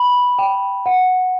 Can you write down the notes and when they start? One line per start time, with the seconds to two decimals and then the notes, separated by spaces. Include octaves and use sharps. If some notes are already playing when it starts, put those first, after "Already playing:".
Already playing: B5
0.39 G5
0.86 F#5